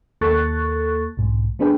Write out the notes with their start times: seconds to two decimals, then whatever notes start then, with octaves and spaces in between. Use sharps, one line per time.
0.21 D#2 A#3 A4 C#6 F#6 A6
1.17 B1 G#2
1.59 A3 B3 D4 G#4 B4 G5